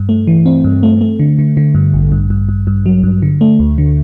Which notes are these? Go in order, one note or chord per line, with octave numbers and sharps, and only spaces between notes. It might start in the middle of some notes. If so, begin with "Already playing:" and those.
Already playing: G2
A3
E3
C4
G2
A3
A3
D3
D3
D3
G2
A1
G2
G2
G2
G2
F#3
G2
D3
A3
D2
D3